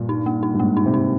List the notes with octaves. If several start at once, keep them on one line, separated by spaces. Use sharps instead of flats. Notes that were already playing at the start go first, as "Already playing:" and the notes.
Already playing: G2 A#2
D#4
A#3
D#4
G2
G#2 A#3
D#4
G#2 C3
D#4